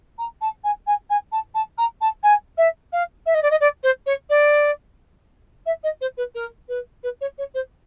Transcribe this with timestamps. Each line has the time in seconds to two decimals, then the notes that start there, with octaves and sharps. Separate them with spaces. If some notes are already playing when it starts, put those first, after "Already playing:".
0.18 A#5
0.41 A5
0.64 G#5
0.87 G#5
1.10 G#5
1.32 A5
1.54 A5
1.78 A#5
2.01 A5
2.23 G#5
2.58 E5
2.93 F5
3.26 E5
3.34 D#5
3.42 D5
3.51 D#5
3.60 D5
3.83 C5
4.06 C#5
4.30 D5
5.66 E5
5.83 D#5
6.01 C5
6.17 B4
6.35 A#4
6.68 B4
7.03 B4
7.21 C#5
7.38 C#5
7.54 C5